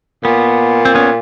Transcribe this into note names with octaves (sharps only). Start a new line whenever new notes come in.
A#2 B3
C4
B3 C#4